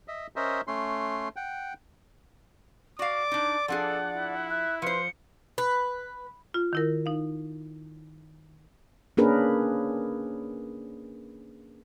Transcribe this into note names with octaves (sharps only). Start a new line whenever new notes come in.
D#5 E5
C#4 A#4 C5 D#5 E5
A3 C#4 C6
F#5 G5
F#4 D5 F5 D6
D4 D#4
F3 D4 G#4 A4 F#5
E4
E5 F#6
F3 B4 C5 C#7
B4
F4
D#3 E4 A#4
D#4 F5
A#3 C#4 D4 G#4 A#4 B4